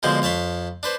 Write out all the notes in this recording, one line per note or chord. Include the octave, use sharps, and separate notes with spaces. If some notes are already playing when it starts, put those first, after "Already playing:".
B2 D3 F3 G#3 C4
F2 C#5 A5 B5 C6
D4 B4 C5